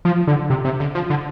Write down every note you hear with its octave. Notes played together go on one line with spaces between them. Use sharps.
F3
D3
C3
C3
D3
F3
D3